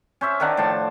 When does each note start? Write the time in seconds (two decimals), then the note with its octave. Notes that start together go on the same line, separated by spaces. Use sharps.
0.21 C#4 C5 E5
0.40 D#3 D4 A#4 F#5
0.57 A2 F3 A5